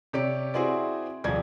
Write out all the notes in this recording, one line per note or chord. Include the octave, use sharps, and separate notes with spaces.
C3 G4 C#5 D5 D7
C4 E4 F#4 G#4 C5 D5
D#1 C2 F3 G#4 D5 G#6